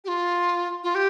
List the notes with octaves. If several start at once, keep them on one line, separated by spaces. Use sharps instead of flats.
G4
F4
F4
G4